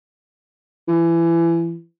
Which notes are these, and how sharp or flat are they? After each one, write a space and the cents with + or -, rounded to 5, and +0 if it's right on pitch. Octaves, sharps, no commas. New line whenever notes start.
E3 +25